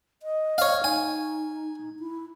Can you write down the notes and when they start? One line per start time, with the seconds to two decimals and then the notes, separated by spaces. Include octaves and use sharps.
0.23 D#5
0.58 C#5 F5
0.84 D#4 G#5
1.99 E4